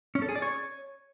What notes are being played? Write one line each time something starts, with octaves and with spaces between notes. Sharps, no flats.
C#4
A4
G#4
D5
C#5